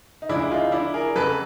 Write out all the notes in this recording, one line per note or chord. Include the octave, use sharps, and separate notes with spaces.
D#4
D2 C#3 F3 G#3 D4 E4
D#4 F4
D4 E4
G#4 A#4
F2 C#3 F#3 A4 B4